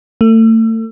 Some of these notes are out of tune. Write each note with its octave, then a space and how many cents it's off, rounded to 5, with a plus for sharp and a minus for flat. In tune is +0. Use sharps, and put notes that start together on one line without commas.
A3 +35